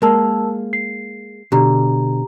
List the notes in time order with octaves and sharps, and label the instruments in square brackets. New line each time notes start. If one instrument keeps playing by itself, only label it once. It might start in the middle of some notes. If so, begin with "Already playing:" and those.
[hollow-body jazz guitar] G#3 A#3 [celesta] A#4 A5 E6
[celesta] C7
[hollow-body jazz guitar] B2 D3 [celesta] G4 A#5